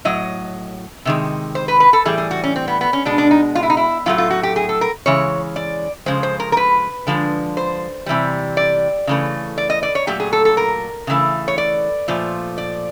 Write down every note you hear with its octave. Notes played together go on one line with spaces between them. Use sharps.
A2 F#3 D#5
C3 D#3 G#3
C5
B4
B4
A4
A2 E3 G3 G#4
G#4
F#4
C#4
C4
B3
B3
C#4
B2 G#3 D4
D4
D#4
F4
E4
D#4
E4
A2 F#3 A3 F4
F4
F#4
G4
G#4
A4
A#4
C#3 E3 G#3 C#5
D5
C#3 F3 G#3 C5
C5
A#4
A#4
B4
D3 F3 G#3
C5
C3 E3 G3
D5
C#3 E3 A3
D5
D#5
D5
C#5
A#2 F#3 A3 G4
G#4
A4
A4
A#4
C#3 E3 A3
C#5
D5
A#2 F3 A3
D5